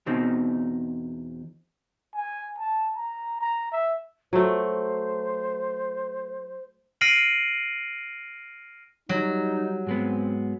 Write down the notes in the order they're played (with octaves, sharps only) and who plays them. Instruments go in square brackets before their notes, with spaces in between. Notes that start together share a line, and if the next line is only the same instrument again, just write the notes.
[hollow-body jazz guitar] E2 B2 C4 D#4
[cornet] G#5
A5
A#5
A#5
E5
[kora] F#3 A3 [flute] C5
[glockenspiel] F6 A#6 C7 D7 D#7 F#7
[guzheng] F#3 [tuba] G3 [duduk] D#4
[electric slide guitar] G#2 G#3 B3 [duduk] C4